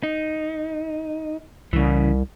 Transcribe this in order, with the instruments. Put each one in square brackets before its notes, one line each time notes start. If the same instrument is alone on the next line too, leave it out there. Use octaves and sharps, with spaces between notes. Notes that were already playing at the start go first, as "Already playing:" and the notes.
[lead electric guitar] D#4
[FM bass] C2 [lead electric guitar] C#3 E3